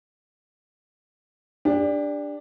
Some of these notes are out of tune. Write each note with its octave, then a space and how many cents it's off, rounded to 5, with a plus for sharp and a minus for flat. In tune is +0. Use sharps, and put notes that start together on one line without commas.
D4 +0 G4 +30